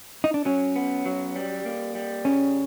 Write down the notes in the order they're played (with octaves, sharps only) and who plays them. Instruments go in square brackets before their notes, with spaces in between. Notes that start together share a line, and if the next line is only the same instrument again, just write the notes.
[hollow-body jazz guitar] D#4
D4
[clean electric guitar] F#3 [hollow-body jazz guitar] C#4
[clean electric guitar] B3
F#3
G3
A#3
G3
[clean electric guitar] C#3 [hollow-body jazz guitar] C#4